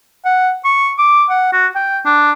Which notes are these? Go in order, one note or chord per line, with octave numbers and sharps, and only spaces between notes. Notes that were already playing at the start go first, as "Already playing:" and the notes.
F#5
C#6
D6
F#5
F#4
G5
D4